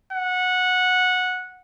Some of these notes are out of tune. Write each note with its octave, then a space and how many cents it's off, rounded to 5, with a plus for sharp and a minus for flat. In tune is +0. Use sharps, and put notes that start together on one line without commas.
F#5 -15